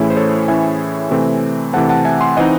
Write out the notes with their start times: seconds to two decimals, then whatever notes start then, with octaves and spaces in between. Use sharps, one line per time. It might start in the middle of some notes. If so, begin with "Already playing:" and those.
Already playing: A2 E3 A3 C#4 E4 G#4
0.10 C5
0.16 A4 C#5
0.48 A2 E3 A3 C#4 E5 G#5
1.11 C3 E3 A3 C4
1.73 C3 E3 A3 C4 F#5 A5
1.89 F#5 A5
2.05 E5 G#5
2.21 G#5 C6
2.37 E3 C4 D#4 D#5 F#5